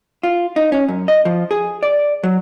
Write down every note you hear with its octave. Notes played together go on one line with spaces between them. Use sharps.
F4
D#4
C#4
F#2
D#5
F3
G#4
D5
F#3